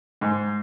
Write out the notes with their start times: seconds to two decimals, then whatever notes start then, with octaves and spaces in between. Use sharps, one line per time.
0.21 G#2